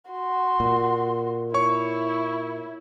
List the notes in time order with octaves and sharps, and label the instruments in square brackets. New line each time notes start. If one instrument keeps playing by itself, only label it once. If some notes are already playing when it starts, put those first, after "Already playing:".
[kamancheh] F#4 C6
[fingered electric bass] A#2
[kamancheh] E4 [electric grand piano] C#5 C#6